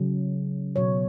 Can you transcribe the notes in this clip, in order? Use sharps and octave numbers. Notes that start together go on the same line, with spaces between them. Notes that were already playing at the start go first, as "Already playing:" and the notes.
Already playing: C#3 F#3
B2 F#3 C#5